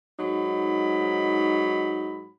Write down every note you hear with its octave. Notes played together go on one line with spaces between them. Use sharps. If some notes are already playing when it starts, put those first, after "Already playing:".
G#2 F#3 D#4 B5